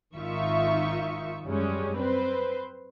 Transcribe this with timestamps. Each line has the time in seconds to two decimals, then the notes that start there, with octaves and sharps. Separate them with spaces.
0.16 G#1 D#3 D#4 F4 E5 C#6
1.46 F#2 G3 G#3 C#4
1.98 C4 B4 C5